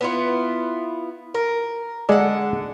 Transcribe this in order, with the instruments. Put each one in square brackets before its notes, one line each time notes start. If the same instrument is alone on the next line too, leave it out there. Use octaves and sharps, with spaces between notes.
[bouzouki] B3 E4 F4
A#4
[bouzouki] D3 F#5 [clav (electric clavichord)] G#3 D5